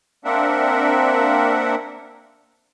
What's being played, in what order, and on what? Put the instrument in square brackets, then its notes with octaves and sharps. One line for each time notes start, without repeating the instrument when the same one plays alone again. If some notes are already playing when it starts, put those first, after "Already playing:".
[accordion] A#3 C4 D4 A#4 E5 F#5